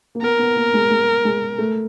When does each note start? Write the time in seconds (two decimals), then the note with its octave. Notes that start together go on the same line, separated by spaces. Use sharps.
0.15 A#3
0.22 B3 A#4
0.39 B3
0.56 A#3
0.74 G#3
0.90 G#3
1.25 G#3
1.58 A3